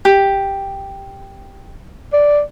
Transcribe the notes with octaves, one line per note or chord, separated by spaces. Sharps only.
G4
D5